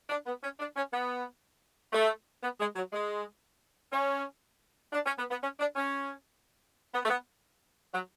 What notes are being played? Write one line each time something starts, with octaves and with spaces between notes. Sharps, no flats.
D4
B3
C#4
D4
C#4
B3
A3
B3
G#3
F#3
G#3
C#4
D4
C#4
B3
B3
C#4
D4
C#4
B3
A3
B3
F#3